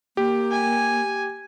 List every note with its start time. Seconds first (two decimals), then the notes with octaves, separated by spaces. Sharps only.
0.17 A#3 G4
0.51 G#5